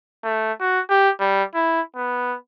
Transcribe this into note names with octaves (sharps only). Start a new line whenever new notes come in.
A3
F#4
G4
G3
E4
B3